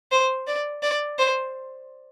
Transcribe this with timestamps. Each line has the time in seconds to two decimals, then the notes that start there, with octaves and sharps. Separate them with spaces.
0.12 C5
0.47 D5
0.83 D5
1.18 C5